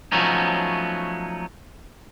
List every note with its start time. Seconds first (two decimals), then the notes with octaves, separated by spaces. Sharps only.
0.12 F3 F#3 A3 B3 C#4 D#4